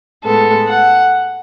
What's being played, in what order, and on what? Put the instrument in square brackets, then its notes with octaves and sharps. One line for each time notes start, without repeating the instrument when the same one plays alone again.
[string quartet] A2 G#3 B3 A4
F#5